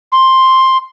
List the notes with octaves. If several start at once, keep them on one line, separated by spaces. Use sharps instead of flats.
C6